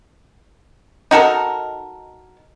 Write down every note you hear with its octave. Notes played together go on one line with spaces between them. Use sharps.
D#4 F#4 A4 A#4